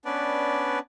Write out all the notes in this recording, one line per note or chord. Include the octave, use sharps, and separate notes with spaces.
B3 C#4 D4 B4 D5